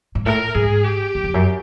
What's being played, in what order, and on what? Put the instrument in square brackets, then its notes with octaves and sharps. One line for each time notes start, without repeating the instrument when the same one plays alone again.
[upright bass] G#2
[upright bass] A2 [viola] A#4
[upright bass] G#2 [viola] G#4
[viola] G4
[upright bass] E2
F2
F#2